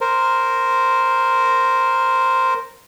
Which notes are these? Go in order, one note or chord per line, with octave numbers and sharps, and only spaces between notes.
A#4 C5